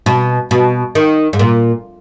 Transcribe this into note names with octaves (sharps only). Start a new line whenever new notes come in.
B2
B2
D#3
G#2
A#2